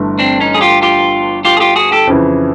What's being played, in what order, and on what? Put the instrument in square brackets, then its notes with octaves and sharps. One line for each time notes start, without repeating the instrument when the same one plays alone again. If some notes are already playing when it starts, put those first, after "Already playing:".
Already playing: [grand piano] G1 G2 E3 A3
[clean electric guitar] C4 D4
C#4 D#4
G#4
F4 G4
F4 G4
F4 G4
G#4
F4 G4
F#4 G#4
G4 A4
[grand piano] F2 C#3 E3